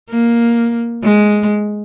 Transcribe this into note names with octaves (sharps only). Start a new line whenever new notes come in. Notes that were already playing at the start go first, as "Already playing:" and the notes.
A#3
G#3